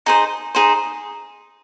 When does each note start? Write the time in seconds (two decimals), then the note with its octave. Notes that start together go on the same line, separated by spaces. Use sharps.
0.06 D#4 G#4 C5
0.55 D#4 G#4 C5